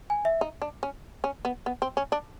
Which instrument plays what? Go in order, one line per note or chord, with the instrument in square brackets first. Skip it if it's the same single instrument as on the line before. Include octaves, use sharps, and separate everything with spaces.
[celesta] G#5
E5
[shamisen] D#4
D4
C#4
C#4
B3
B3
C4
C#4
D4